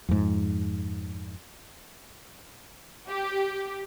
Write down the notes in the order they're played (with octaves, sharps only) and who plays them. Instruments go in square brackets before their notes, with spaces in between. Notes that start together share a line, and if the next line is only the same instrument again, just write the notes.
[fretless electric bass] F2 G#2
[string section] G4